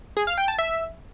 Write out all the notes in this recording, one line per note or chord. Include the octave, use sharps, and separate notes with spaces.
G#4
F5
G5
A5
E5